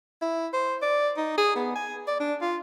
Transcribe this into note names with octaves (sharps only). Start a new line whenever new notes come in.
E4
C5
D5
D#4
G#4
B3
G#5
D5
D4
F4